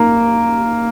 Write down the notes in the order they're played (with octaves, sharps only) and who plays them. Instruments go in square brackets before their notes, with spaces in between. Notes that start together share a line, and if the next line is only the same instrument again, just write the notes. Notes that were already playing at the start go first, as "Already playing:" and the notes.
Already playing: [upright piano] A#3